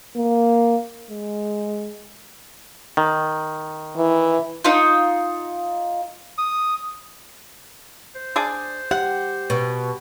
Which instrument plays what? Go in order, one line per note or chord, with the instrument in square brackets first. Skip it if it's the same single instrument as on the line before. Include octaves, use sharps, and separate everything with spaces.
[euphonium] A#3
G#3
[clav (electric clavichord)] D#3
[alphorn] E3
[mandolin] D#4 F4
[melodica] D#6
[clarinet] C5
[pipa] D4 G#4 D5
[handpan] G4 [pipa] F#5
[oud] B2